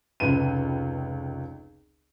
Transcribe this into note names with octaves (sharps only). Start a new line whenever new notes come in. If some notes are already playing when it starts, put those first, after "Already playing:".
F1 C#2 B4 D#7